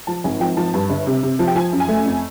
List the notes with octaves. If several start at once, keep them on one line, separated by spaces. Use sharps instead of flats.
F3 A5
G#1 G#5
F3 G5
F3 A5
G2
G1
C3
C3
F3
G5
F3 G#5
F#2
G#5
A3
F2